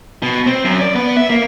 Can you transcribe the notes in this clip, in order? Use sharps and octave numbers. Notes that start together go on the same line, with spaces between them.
B2
C4
F#2
D5
B3
E5
A#3